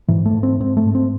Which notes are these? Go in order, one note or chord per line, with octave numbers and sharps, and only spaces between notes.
G#2 E3
A3
G#2
C4
G#2 C4
A3
G#2
C4